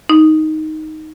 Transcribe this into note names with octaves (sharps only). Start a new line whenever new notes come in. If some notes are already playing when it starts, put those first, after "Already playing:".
D#4